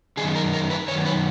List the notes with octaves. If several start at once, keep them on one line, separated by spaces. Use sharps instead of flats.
F#2 D#3 G#4
A#4
A#4
B4
F#2 D#3 C#5
B4